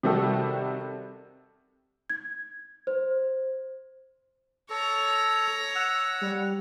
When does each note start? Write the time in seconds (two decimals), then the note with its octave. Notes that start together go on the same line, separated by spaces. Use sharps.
0.03 C3 D#3 G3 F#4 A4
2.10 G#6
2.87 C5
4.70 A4 C#5 A#5
5.75 F#5 E6
6.21 G3